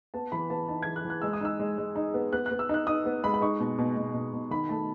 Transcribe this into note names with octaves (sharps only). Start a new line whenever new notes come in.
B3 A5
E3 B5
B3 A5
D#4 A5
E3 G#6
F#6
E3
F#6
G#3 E6
D#6
D#4 E6
G#3
G#3
D#4
B3
B3 F#6
F#6
B3
E6
D#4 F#6
D#4 D#6
B3
G#3 B5
B5
D#4 C#6
B2
B2
B2
B2
B2
D#3 B5
A3 A5